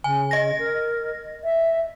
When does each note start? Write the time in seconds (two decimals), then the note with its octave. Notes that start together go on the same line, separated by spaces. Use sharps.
0.04 C#3 G#5
0.31 D#5 A#6
0.59 A#4
1.44 E5